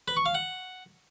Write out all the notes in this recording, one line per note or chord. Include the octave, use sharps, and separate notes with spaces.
B4
C#6
F5
F#5